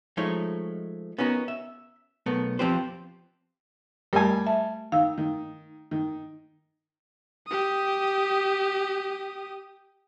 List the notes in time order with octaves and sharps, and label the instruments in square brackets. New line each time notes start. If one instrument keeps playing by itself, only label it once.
[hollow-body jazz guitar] F3 G#3 A3 D#4 C#5
B3 C#4 D#4 F#4 A#4
E5
B1 A3 B3 A#4
F3 C4 F4 G4 B4 C5
[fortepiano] G3 G#5 [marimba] A3 A#4
[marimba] E5 A5
[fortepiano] D#3 [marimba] F5 E6
[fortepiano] D#3
D#3
[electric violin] G4 D#6